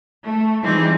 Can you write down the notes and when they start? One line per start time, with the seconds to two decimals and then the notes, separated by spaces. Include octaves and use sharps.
0.23 A3
0.62 E3 F3 G3 G#3 C4 D#4